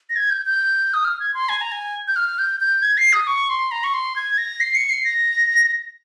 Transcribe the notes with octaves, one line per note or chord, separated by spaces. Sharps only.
A#6
G#6
G6
G6
D#6
F6
G#6
C6
G#5
A#5
G#5
G6
F6
G6
G6
G#6
C7
D#6
C#6
C6
A#5
C#6
C6
G#6
A#6
C7
C#7
C7
A#6